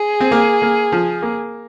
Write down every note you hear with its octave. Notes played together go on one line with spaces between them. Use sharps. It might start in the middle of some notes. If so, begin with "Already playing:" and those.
Already playing: G#4
C4
A#3
A#3
F3
A#3